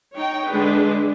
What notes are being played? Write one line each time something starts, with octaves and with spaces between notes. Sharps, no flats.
D#4 C#5 G5
D3 G#3 D4 G#4 B4